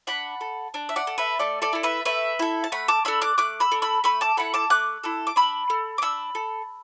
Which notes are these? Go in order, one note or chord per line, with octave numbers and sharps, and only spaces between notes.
D4 F#5 B5
A4
D4
E5
D5 F#5
A4
B4 E5
A3 A4 D5
A4 D5
E4 A4
B4 E5
A3 B4 E5
E4 A4
A5
A3 F#5 B5
A5 D6
D4 A4 B5 E6
D6 F#6
A3 D6 F#6
B5 E6
D4 A4
B5 E6
A3 B5 E6
A5 D6
E4 A4 F#5 B5
A5 D6
A3 D6 F#6
E4 A4
D6
D4 B5 E6
A4
D6
D4 B5 E6
A4